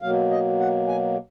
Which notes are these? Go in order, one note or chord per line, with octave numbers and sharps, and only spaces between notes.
B2 F#3 A#3 F5
D#5
F#5
G#5